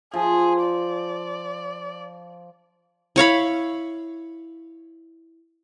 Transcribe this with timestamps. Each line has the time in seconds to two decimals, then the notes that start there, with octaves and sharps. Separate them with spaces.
0.14 F3 G#4
0.64 D5
3.16 E4 C#5 F5 B5